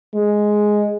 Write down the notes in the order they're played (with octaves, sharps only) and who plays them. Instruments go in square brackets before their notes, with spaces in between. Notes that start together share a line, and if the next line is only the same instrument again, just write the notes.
[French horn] G#3